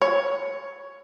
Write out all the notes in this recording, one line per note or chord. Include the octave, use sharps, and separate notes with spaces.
C#5